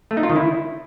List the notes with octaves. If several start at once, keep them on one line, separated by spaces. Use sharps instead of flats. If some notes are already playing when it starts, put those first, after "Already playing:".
A3
D#4
F4
D#3
E4